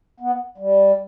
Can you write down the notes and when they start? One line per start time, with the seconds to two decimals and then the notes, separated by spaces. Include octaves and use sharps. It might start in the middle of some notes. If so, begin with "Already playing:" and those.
0.20 B3
0.58 G3